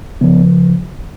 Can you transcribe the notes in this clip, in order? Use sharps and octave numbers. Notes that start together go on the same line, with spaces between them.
C#3 F3 B3